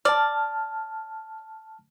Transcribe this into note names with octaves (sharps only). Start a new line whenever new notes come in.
D5 A5 F6